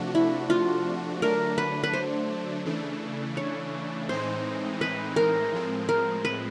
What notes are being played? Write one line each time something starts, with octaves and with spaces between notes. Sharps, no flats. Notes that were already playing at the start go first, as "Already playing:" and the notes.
Already playing: C3 F3 A3 D4 F#4
E4
F4
D3 F#3 A3 D4 A#4
B4
B4
C5
C#3 E3 A3 D4
C#5
A2 E3 G#3 C4 D#4 C5
B4
A#4
A2 F3 G#3 C4
A#4
B4